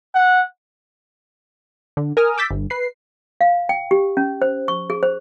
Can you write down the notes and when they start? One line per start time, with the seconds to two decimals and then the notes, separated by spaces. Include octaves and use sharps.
0.15 F#5
1.97 D3
2.17 A#4 G#5 D#6 F6
2.38 D6 E6 G6 A6 B6
2.51 G1
2.70 B4 C7
3.41 F5
3.69 G5
3.91 G4
4.17 C#4
4.42 C5
4.68 C#6
4.90 G#4
5.03 C5